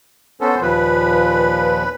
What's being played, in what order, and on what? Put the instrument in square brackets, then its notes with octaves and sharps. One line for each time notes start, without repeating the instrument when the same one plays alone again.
[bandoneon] B3 C#4 A4 [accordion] C5
[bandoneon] D#2 A#2 F3 [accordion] B4